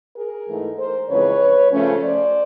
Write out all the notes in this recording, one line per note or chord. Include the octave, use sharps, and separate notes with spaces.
G#4 A#4
G#2 E3 A3
A#4 C5
F2 C#3 E3 G#3 B4 C#5
C#3 F3 A3 C#4
C5 D5